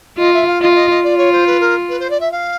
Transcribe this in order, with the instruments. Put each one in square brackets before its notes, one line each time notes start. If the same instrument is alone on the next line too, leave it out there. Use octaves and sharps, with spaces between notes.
[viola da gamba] F4 [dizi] D#5
[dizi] E5
F5
[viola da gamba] F4 [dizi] D#5
[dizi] E5
D#5
D#5
[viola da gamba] F4 [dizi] D5
[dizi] C#5
C5
B4
A#4
B4
C5
D5
E5
F5